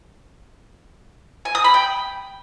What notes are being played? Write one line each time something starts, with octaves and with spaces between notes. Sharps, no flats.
G#5
D#6
B5
G5